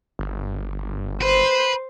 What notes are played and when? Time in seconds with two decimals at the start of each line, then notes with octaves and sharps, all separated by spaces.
0.19 G1
1.22 B4 C5